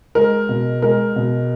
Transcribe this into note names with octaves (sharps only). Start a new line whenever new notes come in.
G#3 A#4
B2
G#3 A#4
B2